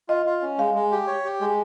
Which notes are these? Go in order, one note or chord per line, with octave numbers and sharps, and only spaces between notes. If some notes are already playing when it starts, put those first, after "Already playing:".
F4 D#5
F4
C#4
G#3 F5
G#3
G4
C#5
G4
G#3